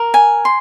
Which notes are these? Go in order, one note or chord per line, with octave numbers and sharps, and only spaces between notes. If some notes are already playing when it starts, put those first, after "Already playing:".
Already playing: A#4
G#5
C6